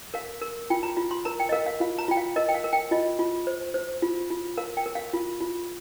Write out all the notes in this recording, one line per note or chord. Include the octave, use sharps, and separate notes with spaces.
A#4 F5
A#4
F4 G5
A#5
F4
C6
A#4 A#5
G5
D#5
A#4 F5
F5
F4 F5
A#5
F4 G5
F5
A#4 D#5
G5
F5
A#4
G5
F4 D#5
F4
C5
C5
F4
F4
A#4 F5
G5
A#4
F5
F4
F4